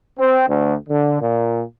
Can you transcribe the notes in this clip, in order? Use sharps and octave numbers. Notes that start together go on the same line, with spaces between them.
C4
D2
D3
A#2